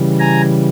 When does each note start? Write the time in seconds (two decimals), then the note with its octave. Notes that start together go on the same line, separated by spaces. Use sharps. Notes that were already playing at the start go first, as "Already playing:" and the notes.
Already playing: C#3 E3 G3
0.20 G#5 A#5